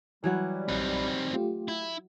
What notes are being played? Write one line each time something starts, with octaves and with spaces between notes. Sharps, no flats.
E3 F#3 G3 F#4
A#1 C4 D#4 F#5 B5
A3 F4 G4
E4